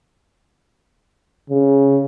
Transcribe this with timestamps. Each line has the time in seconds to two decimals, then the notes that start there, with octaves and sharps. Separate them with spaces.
1.50 C#3